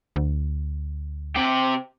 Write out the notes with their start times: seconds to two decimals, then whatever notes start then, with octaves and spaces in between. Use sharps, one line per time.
0.16 D2
1.36 C3 G4